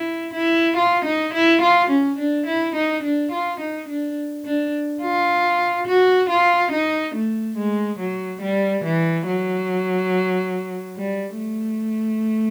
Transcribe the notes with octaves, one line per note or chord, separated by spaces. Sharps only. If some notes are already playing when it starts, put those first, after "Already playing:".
Already playing: E4
E4
F4
D#4
E4
F4
C#4
D4
E4
D#4
D4
F4
D#4
D4
D4
F4
F#4
F4
D#4
A3
G#3
F#3
G3
E3
F#3
G3
A3